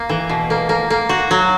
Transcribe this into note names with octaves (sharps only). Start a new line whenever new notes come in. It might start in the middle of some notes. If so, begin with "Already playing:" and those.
Already playing: A#3
E3
B2
A#3
A#3
A#3
F#4
F#3